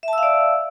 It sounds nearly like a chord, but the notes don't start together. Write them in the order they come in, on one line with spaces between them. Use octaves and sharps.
E5 A5 E6 F5 D5